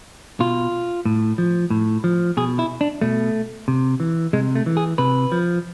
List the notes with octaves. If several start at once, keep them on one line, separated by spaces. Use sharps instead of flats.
B2 F4
A2
F3
A2
F3
B2 G#4
E4
D4
B2 A3
C3
E3
C3 G#3
A3
E3
G#4
C3 B4
F3